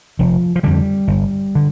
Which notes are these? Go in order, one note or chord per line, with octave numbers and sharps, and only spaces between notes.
F1 F3
F3
F2 D3 G3
G1
D3